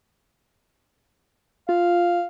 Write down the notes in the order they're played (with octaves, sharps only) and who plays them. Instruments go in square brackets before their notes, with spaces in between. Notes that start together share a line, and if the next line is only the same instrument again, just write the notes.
[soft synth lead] F4 [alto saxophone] F5